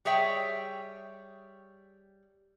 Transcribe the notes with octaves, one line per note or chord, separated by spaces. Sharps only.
G3 G#4 C#5 E5 G5